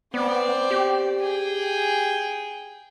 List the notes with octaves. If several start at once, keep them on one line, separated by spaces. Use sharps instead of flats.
B3 C4 D5
G4
G#4 G5